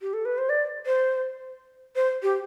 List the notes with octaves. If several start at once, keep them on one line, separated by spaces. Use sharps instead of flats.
G4
A4
B4
C5
D5
C5
C5
G4